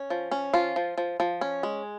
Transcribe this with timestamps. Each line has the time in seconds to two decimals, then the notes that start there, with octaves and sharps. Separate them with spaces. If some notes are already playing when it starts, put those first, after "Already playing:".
Already playing: C#4
0.10 F3
0.31 C#4
0.54 F3 F4
0.76 F3
0.98 F3
1.20 F3
1.41 C#4
1.63 G#3